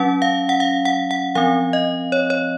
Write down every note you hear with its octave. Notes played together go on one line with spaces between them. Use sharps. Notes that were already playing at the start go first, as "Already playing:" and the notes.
Already playing: F#3 C#4 F#5
F5
F#5
F5
F#5
F#5
F3 C4 F5
D#5
C#5
C#5